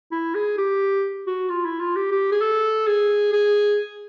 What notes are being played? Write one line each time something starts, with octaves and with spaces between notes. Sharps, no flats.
E4
G#4
G4
F#4
F4
E4
F4
G4
G4
G#4
A4
G#4
G#4